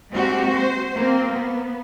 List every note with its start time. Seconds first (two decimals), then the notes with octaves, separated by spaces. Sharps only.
0.10 G#3 A#3 C4 F#4 G4
0.51 C5
0.95 A#3 C4
1.32 B3